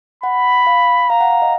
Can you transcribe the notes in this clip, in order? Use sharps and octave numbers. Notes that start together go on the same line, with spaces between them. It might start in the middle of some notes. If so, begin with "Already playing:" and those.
F#5 B5
F5
F5 A#5
F#5
F5
D#5